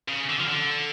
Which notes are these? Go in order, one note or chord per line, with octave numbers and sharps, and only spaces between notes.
C#3
D3
F3
D3